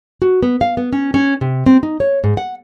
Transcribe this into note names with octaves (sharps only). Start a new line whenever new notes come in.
F#4
B3
F5
B3
C#4
C#4
C3
C4
D#4
C#5
G#2
F#5